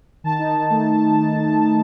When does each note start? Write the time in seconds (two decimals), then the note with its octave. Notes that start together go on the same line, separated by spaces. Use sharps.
0.24 D#3 A5
0.39 D#4
0.55 D#3
0.70 A3